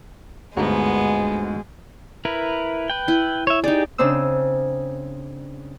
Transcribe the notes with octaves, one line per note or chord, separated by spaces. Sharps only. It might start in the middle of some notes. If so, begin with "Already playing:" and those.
G1 D2 G#2 G#3 B3 A#5
E4 A#4 B4
B4 G5
E4
C#5 E5
D#4 G4 G#4 D5
C#3 C4 D4 D#4 C5 E6